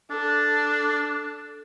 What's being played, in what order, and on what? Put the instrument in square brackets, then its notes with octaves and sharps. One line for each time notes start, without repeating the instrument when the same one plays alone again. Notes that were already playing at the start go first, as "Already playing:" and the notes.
[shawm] D4 [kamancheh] A4